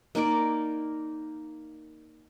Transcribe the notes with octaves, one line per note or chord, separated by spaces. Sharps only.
A#3 D#4 A#4 D5